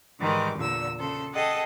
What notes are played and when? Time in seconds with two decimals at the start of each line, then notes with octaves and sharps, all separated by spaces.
0.20 G#2 D#3 E3 G3 G#3 D6
0.56 E2 A#2 D3 E6
0.99 C#3 A4 C5
1.34 G#4 A4 D#5 F#5 G5 A5